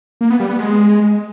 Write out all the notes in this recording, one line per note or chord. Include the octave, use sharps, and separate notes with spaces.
A#3
B3
G3
B3
G#3